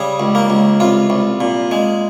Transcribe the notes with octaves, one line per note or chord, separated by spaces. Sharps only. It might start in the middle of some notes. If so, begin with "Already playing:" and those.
Already playing: C#3 G3 G#4
C#2
A#3
C#2
C2 F4
C2
A#2
G#3